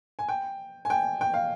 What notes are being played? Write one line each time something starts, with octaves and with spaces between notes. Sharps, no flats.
G#5
G5
G#5
G5
G5
F5